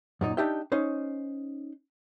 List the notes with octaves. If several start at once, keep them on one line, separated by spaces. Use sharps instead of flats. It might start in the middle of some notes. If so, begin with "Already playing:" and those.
F#2 A#2 D#4
D4 D#4 G4 E5 G5
C#4 D#4 C5